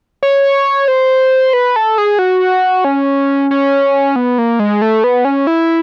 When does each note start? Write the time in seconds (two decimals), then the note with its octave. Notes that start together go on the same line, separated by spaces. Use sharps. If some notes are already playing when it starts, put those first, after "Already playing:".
0.23 C#5
0.88 C5
1.53 B4
1.76 A4
1.98 G#4
2.19 F#4
2.85 C#4
3.51 C#4
4.16 B3
4.38 A#3
4.59 G#3
4.82 A3
5.04 B3
5.25 C#4
5.47 E4